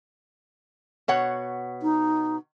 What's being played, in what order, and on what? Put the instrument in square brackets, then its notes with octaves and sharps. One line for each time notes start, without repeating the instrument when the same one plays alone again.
[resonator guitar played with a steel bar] B2 C#5 F#5
[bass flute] D#4